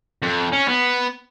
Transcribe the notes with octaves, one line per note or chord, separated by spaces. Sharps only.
F2
C#4
B3